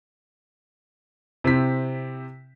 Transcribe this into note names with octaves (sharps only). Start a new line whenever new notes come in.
C3 C4 E4 B6